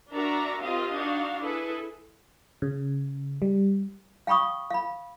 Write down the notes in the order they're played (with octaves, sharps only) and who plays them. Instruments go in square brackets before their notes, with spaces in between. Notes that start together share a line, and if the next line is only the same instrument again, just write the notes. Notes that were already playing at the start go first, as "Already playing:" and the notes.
[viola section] D4 F#4 A#4 D5 E5 A#5
C4 F4 G4 A#4 D#5 F5
D4 D#4 F#4 F5
E4 G#4 A4 B4 E5
[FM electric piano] C#3
G3
[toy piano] F5 G5 B5 C#6 D#6
F5 B5